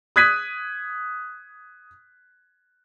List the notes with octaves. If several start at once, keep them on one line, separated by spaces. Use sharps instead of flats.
D#6 F#6 G#6 B6 D#7